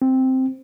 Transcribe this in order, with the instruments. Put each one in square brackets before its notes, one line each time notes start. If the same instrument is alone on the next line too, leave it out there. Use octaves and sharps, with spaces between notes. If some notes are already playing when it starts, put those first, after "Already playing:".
[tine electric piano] C4